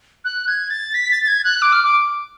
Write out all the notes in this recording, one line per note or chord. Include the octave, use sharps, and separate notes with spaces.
F#6
G#6
A6
B6
A6
A6
G#6
F#6
D6
F6
D6